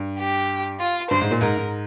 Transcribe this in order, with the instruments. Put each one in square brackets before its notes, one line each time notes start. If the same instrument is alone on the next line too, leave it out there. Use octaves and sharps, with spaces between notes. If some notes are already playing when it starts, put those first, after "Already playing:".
Already playing: [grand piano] G2
[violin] G4
F4
[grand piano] G2 [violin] C5
[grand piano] G#2
A#2
[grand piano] G#2 [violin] A#4
[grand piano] G#2